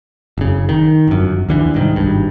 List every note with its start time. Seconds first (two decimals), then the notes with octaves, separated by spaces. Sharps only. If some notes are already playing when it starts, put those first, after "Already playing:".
0.38 F#1 C#3
0.69 D#3
1.07 G1 F#2
1.49 D#2 D3 E3
1.74 C2 G#2 D#3
1.96 G#1 G2